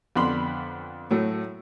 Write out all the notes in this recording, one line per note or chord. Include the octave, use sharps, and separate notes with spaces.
F2 D3 B3 B5 C6
A2 F#3 A3